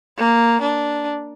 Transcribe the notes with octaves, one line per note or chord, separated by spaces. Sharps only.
A#3
D4